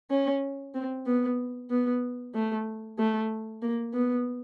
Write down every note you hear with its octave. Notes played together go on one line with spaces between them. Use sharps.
C#4
C4
B3
B3
A3
A3
A#3
B3